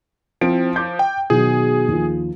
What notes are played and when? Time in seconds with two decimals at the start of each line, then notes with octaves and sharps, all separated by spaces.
0.41 F3 C4 E4 D7
0.76 D6 G6
0.99 G5
1.30 B2 D#3 F#3 G#4
1.88 D#2 F3